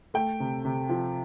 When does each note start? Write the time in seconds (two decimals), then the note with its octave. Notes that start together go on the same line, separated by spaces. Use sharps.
0.14 A3 G5
0.40 C3
0.65 C3
0.90 F3